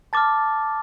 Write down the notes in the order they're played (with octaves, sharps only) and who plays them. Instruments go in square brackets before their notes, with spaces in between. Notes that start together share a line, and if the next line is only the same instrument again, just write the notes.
[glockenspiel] A5 D6 F6 A6